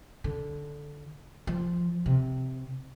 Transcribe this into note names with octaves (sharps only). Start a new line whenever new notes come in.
D3
F3
C3